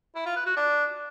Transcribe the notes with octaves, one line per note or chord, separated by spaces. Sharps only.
E4
F4
B4
F#4
D4